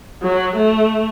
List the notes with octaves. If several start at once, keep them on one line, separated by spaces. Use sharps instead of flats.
F#3
A3